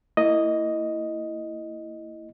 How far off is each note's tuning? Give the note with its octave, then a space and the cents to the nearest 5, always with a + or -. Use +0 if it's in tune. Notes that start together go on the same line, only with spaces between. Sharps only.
A#3 -25 E4 +0 D#5 +0